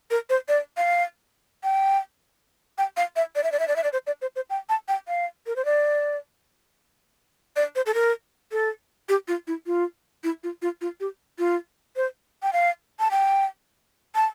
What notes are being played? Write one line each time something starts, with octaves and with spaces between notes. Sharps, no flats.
A#4
C5
D5
F5
G5
G5
F5
E5
D5
E5
D5
E5
D5
E5
D5
C5
D5
C5
C5
G5
A5
G5
F5
A#4
C5
D5
D5
C5
A4
A#4
A4
G4
F4
E4
F4
E4
F4
F4
F4
G4
F4
C5
G5
F5
A5
G5
A5